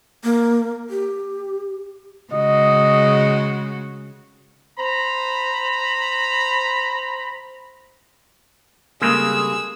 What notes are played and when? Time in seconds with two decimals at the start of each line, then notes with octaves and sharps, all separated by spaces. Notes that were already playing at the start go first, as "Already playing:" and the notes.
0.24 A#3
0.90 G4
2.33 C#3 G#3 F#4 D#5
4.79 C5 A#5 B5
9.01 C#3 G3 G#3 A#3 C4 G#4 A4 E6